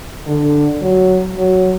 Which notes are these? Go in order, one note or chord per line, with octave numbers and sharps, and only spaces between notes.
D3
F#3
F#3